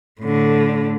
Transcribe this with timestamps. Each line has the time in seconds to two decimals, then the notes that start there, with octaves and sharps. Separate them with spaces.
0.21 A2 D3